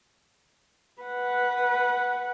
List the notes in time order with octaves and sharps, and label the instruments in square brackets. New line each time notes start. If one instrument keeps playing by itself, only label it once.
[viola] B4 F#5